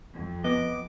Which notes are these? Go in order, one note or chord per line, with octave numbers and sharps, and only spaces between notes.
F2
F3 B3 D#5 D6